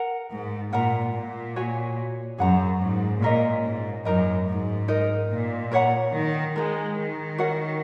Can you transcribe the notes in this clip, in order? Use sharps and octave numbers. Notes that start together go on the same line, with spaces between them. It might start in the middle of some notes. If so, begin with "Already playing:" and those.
Already playing: A#4 F#5 A#5
G#2
A#2 A#4 F#5 A#5
A#2
F#4 C#5 G#5
F#2 G#4 F#5 A#5
G#2
A#2 C#4 A#4 D#5
G#2
F#2 D#4 A#4 D#5 A#5
G#2
D#4 A#4 D#5
A#2
A#4 C#5 F#5 A#5
D#3
G#3 D#4 F#4 A#4
D#3
C#4 F#4 A#4 F#5